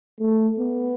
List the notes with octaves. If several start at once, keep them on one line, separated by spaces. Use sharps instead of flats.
A3
B3